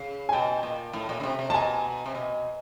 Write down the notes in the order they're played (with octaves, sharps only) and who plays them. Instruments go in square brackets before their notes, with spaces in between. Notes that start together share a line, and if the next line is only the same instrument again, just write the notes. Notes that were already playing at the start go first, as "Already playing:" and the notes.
Already playing: [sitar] C#3
[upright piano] G#5
[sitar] B2 [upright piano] G5 A5
[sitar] A#2
A2
A#2
C#3
C3
C3
[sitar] A#2 [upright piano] A5
[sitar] B2 [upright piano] G#5 A#5
[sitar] C3
B2